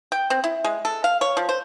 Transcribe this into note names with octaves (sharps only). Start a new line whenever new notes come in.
G5
C4
E4
G#3
A4
F5
C#5
F3
C5